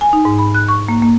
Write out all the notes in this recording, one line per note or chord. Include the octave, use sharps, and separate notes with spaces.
G#5
D#4
G#2
B5
F#6
C#6
A#3
A#3